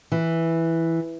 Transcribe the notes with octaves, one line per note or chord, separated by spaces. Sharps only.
E3